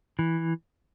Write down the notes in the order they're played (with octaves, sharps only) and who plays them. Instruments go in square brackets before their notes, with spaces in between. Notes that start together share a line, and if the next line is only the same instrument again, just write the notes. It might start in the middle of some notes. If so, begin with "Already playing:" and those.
[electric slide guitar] E3